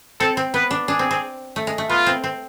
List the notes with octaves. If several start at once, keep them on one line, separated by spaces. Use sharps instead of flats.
C4 A4
C4
B3 B4
D4
D4 G#4
C4
C4
A3
G#3
A3
B3 F4
C4
C4